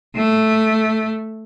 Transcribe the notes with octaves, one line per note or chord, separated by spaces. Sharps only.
A3